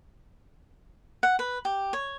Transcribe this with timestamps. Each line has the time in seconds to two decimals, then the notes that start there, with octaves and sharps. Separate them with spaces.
1.23 F#5
1.39 B4
1.65 G4
1.93 C#5